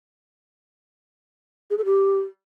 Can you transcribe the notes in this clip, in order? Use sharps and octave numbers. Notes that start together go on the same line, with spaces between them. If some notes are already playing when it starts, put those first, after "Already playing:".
G#4
A4
G4